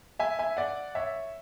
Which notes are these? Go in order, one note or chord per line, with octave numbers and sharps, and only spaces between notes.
E5 G#5
E5 G#5
D5 F#5
C#5 E5